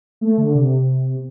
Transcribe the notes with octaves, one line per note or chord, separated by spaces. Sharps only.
A3
D3
C3